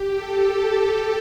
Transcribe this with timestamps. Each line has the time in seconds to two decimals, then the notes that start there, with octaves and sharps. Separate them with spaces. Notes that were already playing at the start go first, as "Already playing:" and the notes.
Already playing: G4
0.11 A4